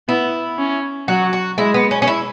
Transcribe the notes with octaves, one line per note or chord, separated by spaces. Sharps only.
B3 E4
C#4
F#3 F#4
F#4
G#3 E4
B3
C#4
C#4
E4